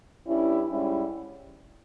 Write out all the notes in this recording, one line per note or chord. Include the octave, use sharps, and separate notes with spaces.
G2 G3 C#4 E4
G#2 G3 C#4 E4